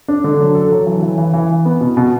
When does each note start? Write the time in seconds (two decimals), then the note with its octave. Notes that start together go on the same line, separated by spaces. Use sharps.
0.08 D4
0.24 D3
0.40 F#3
0.55 A4
0.72 F#3
0.86 E3
1.02 E3
1.18 E3
1.34 E3
1.50 E3
1.65 B3
1.81 B2
1.97 B2